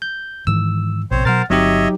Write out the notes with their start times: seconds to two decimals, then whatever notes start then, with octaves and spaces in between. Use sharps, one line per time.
0.02 G6
0.47 G#2 D#3 E3 E6
1.11 A#1 B2 C4 C5 C#5
1.25 B2 F#3 A#4 C5 F#5 F6 A6
1.50 G1 F#3 C4 D#4 G4 C#5 D#5 E5